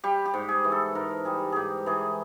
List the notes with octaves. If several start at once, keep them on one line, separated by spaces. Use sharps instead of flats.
G3 G4
G4
G#2
G#4
E3
A4
G#2 A#4
G3 G#4
G#2 G4 G#4
E3 G#4